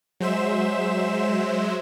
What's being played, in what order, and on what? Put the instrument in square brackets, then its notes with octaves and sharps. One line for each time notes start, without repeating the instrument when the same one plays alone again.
[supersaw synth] F#3 G#3 C5 E5 E7